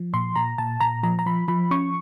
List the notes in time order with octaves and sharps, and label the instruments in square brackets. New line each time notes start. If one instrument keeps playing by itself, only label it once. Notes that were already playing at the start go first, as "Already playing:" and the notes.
Already playing: [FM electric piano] F3
A#2 C6
A#2 A#5
A#2 A5
A#2 A#5
F3 A#5
A#5
F3 B5
F3 B5
C#4 C#6